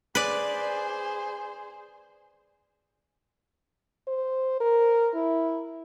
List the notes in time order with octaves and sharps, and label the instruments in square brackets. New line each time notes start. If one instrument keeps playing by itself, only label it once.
[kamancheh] G#4 C5 [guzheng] B4 D5
[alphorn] C5
A#4
E4